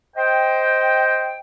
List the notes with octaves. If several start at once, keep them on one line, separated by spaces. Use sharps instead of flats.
C5 D#5 G5